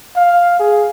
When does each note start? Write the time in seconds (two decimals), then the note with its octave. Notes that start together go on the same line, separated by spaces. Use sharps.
0.16 F5
0.59 G#4